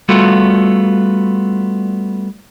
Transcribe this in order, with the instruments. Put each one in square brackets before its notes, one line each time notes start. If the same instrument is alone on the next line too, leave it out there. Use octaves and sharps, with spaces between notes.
[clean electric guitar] G3 A3 B3 F4 F#4 A4